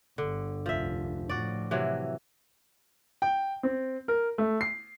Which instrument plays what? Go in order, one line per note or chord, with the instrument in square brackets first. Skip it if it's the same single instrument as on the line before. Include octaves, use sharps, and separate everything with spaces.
[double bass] G1 [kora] D3
[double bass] F1 C2 [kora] F3 E5
[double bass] A2 F3 [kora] F#4 D5
[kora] C3 E3 F#3
[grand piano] G5
C4
A#4
A3
C7